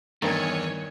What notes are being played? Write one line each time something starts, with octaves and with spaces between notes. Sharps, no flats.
E2 G2 D#3 C#5 G#5